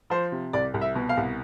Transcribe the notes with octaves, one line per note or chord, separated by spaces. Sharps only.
F3 C5
C3
C2 D5
C2
E5
B2
F5
C2